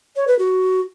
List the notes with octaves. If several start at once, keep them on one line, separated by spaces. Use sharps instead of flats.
C#5
B4
F#4